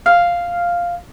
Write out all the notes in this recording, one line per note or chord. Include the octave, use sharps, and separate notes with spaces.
F5